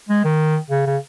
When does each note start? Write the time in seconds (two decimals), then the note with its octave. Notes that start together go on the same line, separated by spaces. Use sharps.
0.09 G#3
0.24 D#3
0.71 C#3
0.87 C#3